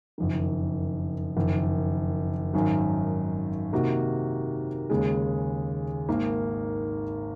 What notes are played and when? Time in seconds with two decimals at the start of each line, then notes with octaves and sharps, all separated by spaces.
0.18 F#1 F2 D#3
1.36 F#1 F2 D#3
2.54 G#1 F#2 D#3
3.72 C3 D#3 A#3 D#4 F#4
4.90 D#2 C#3 G#3
6.09 G#1 G#2 D#3 A#3